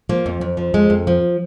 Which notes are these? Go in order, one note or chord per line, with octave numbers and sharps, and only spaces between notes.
F3 A#3
F2
F2
F3
F2 G#3
F2
F3